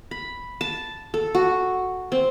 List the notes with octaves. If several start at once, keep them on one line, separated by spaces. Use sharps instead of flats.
B5
A5
A4
F#4
C4